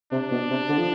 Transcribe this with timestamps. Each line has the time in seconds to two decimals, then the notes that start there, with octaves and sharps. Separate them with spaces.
0.12 C3 D4
0.31 B2
0.50 C3
0.69 D3
0.78 F3